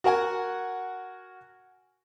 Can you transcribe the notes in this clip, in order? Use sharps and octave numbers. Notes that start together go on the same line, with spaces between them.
F#4 A#4 F#5 G#5